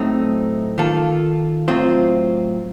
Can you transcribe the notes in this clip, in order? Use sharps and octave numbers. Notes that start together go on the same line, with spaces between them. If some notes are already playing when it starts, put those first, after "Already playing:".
Already playing: A2 F#3 A3 C4 D#4
D#3 A#3 F4 A4
A2 F#3 C4 F4 C5